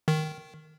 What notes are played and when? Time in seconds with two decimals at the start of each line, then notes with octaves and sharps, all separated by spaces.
0.08 D#3